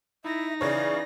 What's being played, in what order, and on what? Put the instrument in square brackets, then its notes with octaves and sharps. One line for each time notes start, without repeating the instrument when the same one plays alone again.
[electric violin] D#4 A#6 [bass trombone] E4 [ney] E5
[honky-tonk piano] C#3 C#5 [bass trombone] E3 [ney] D5